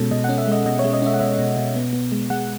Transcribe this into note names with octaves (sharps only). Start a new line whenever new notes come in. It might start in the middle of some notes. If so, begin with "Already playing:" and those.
Already playing: B2 G#3 C#4 A4
B2 D#5
F#5
C#4
E5
G#3 D#5
B2 D#5
C#5
G#3
D#5
C#4 E5
F#5
B2 E5
B2
B2
B3
B3
G#3
G#3 F#5